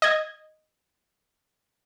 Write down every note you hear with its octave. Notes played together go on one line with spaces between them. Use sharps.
D#5 G#6